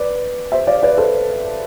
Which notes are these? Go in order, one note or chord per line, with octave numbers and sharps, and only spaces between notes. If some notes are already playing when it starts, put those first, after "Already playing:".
Already playing: B4 D5
C5 E5
D5 F5
B4 D5
A4 C5